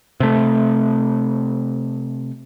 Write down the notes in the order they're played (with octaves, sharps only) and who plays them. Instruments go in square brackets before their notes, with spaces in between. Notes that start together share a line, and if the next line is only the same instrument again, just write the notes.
[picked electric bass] C3 A3